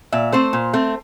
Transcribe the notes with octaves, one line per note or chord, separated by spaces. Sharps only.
A#2 E5
A3 C4 C5
A#2
A3 C4